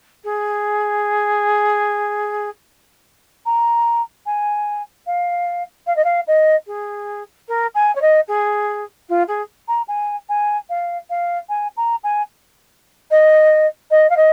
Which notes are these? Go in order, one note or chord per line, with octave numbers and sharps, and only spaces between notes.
G#4
A#5
G#5
F5
F5
D#5
F5
D#5
G#4
A#4
G#5
C#5
D#5
G#4
F4
G#4
A#5
G#5
G#5
F5
F5
G#5
A#5
G#5
D#5
D#5
F5
D#5